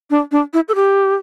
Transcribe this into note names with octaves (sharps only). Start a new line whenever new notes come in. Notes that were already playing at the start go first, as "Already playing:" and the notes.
D4
D4
E4
A4
G4